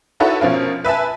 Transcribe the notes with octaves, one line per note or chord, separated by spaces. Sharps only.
D#4 E4 F#4 A4 B4 C#5
B2 F3 C#4 F4 A#4
B4 E5 G#5 A5